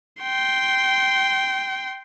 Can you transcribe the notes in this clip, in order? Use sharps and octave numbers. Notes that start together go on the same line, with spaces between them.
G5 C6